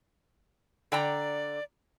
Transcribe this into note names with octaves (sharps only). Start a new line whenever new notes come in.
D3 D5 G5 A#5